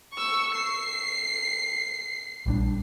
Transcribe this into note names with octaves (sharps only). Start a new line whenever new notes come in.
C#6 E6
C7
A#1 G3 D4